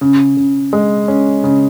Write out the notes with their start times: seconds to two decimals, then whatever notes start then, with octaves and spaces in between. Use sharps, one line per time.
0.01 C#3
0.37 C#3
0.73 G#3
1.08 C#4
1.44 C#3